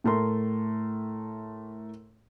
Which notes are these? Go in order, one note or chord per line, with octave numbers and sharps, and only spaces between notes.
A2 A3 A#4 C6